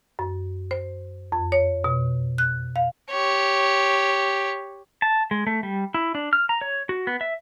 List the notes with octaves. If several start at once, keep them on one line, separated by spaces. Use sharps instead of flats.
F#2
C5
F2
C#5
B2
F#6
F5
G4 C#5
A5
G#3
A3
G3
E4
D4
F6
A#5
C#5
F#4
B3
E5